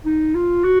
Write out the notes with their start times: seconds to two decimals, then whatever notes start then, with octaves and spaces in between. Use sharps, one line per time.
0.06 D#4
0.35 F4
0.64 F#4